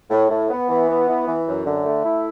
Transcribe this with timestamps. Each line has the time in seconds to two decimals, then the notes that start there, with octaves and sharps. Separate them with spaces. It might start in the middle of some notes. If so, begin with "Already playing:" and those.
0.10 A2
0.29 A2
0.49 B3
0.68 E3
0.88 B3
1.08 E3
1.27 E3
1.47 F#2
1.66 D3
1.85 A3
2.04 E4